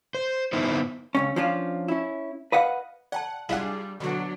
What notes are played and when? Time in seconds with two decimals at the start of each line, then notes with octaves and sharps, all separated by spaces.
0.15 C5
0.53 B3 D#4 E4 C5
1.15 C#2 F#2 C#4
1.36 F3 C#4 D4 F4
1.88 C#4 E4
2.52 B4 D#5 F5 F#5
3.12 D5 F#5 G5 A5
3.49 G3 D4 E4 F4 G#4 E5 F#5
4.00 B2 D3 F#3 D4 F#4